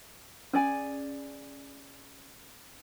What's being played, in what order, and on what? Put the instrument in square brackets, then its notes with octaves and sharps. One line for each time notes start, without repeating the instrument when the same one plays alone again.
[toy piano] C#4 [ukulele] G#4 D5 G#5